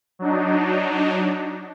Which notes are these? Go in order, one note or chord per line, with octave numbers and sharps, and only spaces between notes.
F#3 D4 D#4